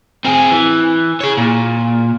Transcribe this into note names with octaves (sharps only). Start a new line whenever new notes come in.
C4 G#4
E3
G#4 C#5
A#2